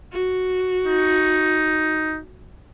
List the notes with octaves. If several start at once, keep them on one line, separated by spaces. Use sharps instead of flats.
F#4
D#4